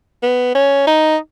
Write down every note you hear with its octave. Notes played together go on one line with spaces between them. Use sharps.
B3
C#4
D#4